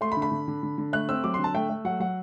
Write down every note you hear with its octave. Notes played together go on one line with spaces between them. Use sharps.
A3 C6
B5
D3
B5
D3
D3
D3
D3
A3 F#6
C4 E6
F#3 D6
D3 C6
A5
A3 G5
A3
F#3 F#5
F#3 F#5